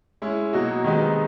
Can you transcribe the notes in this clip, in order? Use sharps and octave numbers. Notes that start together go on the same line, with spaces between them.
G#3 C#4 E4
B2 F#3 A#3 D#4 F#4
C3 D#3 G#3 B3 D#4